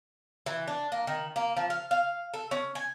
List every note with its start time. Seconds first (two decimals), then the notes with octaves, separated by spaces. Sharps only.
0.46 E3
0.68 D4
0.92 A#3
1.07 D#3
1.36 A#3
1.57 F3
1.70 F5
1.91 F5
2.34 A4
2.51 C#4
2.75 G#5